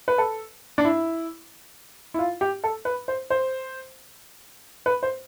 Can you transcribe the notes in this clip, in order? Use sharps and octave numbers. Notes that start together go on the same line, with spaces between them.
B4
A4
D4
E4
E4
F4
G4
A4
B4
C5
C5
B4
C5